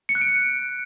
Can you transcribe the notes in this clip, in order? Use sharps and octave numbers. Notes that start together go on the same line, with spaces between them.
C#7
F#6
D7